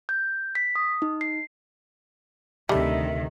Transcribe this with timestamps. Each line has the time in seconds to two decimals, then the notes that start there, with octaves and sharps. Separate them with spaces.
0.09 G6
0.55 B6
0.75 D#6
1.02 D#4
1.21 C7
2.69 D2 C3 D#3 G3 A3 E5